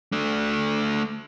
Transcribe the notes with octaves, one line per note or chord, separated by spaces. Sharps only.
A3 D4